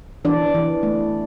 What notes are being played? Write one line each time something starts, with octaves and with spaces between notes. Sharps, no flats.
E3 D4 D5
E3
A3